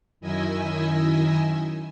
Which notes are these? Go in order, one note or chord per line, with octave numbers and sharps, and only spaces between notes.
F#2 D#3 E4 D#5 G#5 E6